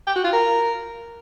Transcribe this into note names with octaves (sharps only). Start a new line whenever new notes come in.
G5
F#4
F4
A#4